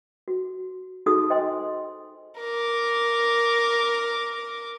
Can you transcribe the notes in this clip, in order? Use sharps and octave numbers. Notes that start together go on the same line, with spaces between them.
F#4
D#4 F#4 G#4 A4 D#6
C5 D#5 G5 G#5 C6
A#4 D6